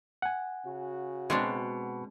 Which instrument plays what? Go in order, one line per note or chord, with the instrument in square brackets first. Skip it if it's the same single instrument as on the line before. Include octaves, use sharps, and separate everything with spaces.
[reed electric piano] F#5 G#5
[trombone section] C#3 F#4
[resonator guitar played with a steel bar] B2 [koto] G#3 C4 D4